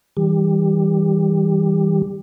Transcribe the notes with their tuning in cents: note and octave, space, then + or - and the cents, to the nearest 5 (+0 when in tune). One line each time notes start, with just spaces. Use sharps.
E3 -35 G3 +0 G4 +20